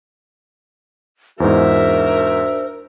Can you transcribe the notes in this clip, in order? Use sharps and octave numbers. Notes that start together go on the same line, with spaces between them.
E2 G#2 D4 F#4 A#4 C5 E5